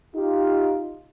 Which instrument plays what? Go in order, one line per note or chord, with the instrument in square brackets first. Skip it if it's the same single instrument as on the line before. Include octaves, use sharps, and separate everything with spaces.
[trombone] D#4 [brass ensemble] F4 G4